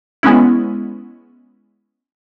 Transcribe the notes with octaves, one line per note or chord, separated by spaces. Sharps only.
G#3 B3 C#4 E4